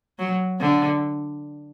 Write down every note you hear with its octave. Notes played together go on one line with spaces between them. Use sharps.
F#3
D3